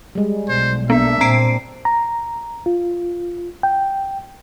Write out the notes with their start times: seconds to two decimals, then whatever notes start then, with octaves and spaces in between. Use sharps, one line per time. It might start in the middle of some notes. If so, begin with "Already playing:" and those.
0.15 G3 G#3
0.49 B1 C5
0.90 A#3 B3 D4 E5
1.21 A#2 C4 A#5 C7 D7
1.85 A#5
2.66 F4
3.63 G5